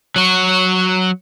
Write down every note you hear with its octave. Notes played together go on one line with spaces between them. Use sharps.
F#3 F#4